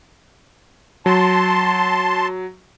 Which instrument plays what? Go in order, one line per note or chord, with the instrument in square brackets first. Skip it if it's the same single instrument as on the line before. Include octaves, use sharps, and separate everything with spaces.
[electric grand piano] F#3 [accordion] A5 C6